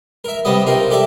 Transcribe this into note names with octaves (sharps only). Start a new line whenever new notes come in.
A#4 E5
C3 G3 B3 D#5
C4 D#4 F4 A#4
G4 A4 D5 E5